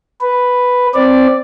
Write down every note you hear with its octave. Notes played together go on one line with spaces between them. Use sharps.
B4
C4 D5